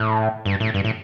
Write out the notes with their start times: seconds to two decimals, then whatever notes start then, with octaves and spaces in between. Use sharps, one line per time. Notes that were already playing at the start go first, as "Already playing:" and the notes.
Already playing: A2
0.45 G2
0.60 A2
0.74 G2
0.84 A2